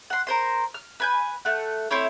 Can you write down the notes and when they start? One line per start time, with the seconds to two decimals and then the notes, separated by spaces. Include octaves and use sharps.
0.10 F#5 C6
0.27 A#4 C5 C6
0.74 F6
1.00 B4 G#5 G6
1.45 A3 F#5
1.91 A3 C4 E4 C#5